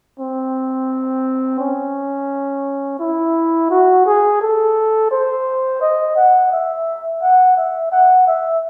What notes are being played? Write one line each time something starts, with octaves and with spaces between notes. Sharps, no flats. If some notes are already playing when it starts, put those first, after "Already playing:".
C4
C#4
E4
F#4
G#4
A4
C5
D#5
F#5
E5
F#5
E5
F#5
E5